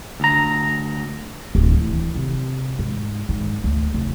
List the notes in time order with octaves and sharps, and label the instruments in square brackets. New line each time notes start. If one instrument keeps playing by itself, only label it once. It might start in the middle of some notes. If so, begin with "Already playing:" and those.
[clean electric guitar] D2 A#5
[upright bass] D1
E3
C3
G#2
G#2
D2
F1